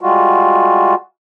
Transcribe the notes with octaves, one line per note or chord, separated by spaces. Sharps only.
G3 G#3 F4 F#4